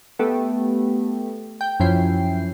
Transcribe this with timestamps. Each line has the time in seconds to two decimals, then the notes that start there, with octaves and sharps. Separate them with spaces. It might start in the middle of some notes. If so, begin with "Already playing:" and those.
0.19 A3 B3 G4
1.61 G5
1.80 F#2 F3 C#4 E4 G5 C7